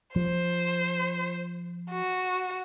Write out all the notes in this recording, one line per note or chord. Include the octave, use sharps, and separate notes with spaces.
F3 C5
F#4